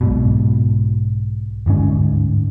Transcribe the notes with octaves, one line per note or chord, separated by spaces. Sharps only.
B1 G#2 B2
G1 D2 G#2 C#4